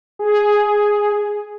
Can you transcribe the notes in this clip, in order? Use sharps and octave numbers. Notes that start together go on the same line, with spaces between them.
G#4